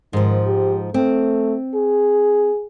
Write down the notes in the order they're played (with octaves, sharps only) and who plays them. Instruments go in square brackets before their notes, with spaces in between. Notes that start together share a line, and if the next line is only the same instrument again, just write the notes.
[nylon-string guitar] G#2 F3 [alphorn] D#3
[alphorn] G4
[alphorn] A3 [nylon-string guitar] C4
[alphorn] G#4